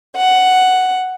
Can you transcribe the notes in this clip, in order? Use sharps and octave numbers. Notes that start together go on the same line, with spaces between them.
F#5